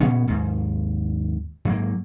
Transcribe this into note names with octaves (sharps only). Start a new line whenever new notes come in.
A#2 B3 C#4
D#2 G#2
G#2 F#3 A#3